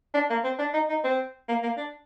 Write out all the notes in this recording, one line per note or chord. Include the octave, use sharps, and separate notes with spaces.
D4
A#3
C4
D4
D#4
D#4
C4
A#3
A#3
D4